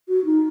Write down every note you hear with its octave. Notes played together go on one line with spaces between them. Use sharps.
F#4
D#4